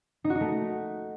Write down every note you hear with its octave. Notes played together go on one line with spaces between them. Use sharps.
D#4
F#4
D#4
A3